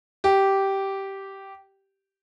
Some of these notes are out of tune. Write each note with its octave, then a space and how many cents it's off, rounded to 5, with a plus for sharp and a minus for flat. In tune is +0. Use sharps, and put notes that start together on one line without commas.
G4 -10